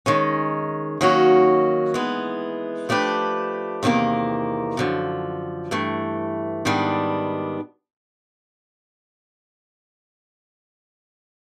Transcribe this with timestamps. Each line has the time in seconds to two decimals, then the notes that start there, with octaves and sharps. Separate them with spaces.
0.06 D#3 G#3 C#4
1.01 D#3 F#3 A#3 C#4 F#4
1.94 E3 G#3 B3
2.89 F3 A3 D4 G4 B4
3.83 E2 C3 D#3 G3 A#3
4.77 F#2 D3 F3
5.71 G2 E3 A3
6.65 G#2 D#3 G3 B3 D4